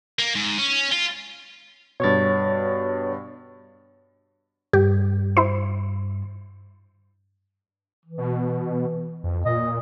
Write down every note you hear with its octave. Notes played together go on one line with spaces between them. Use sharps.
A#3
G#2
C#4
F4
G2 B2 C#5 C#6 A6
G2 G4
E4 C5
E3
B2
F2
A#2 D#5